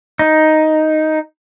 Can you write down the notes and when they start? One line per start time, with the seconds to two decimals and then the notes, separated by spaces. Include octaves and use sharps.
0.19 D#4